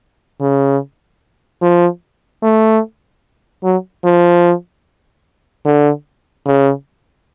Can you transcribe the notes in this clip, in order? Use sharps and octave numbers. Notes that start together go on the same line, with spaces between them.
C#3
F3
A3
F#3
F3
D3
C#3